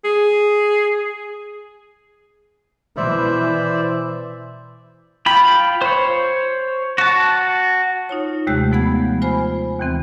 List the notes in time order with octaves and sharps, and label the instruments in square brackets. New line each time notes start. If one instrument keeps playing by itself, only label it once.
[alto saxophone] G#4
[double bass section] B2 E3 [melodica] C5 D5 E5
[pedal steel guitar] F4 G5 B5
C5 C#5
F#4 A5
[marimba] D#4 F4 C#5
D#2 C3 G#3 A3 G4 G6
F3 G#3 B3 F#5 B5 G#6
F4 C5 G#5 B5
D#2 E3 C4